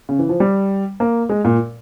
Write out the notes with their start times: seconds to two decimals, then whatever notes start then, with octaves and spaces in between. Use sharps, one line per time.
0.09 C#3
0.19 E3
0.29 F3
0.40 G3
1.00 A#3
1.29 G#3
1.45 A#2